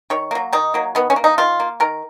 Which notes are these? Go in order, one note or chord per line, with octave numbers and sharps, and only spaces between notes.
D#3 C#5
F#3 A#3
D#3 D#4
F#3 A#3
D#3 B3
C#4
A#3
D#4
D#3 F4
A#3
D#3 A#4